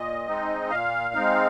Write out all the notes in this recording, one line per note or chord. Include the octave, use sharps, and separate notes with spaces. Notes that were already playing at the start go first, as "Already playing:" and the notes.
Already playing: A#2 D#5
G#3 C4 D#4
A#2 F5
G#3 C4 D#4